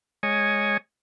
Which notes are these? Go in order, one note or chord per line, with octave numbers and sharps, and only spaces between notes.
G#3 C#5 D#5 G#5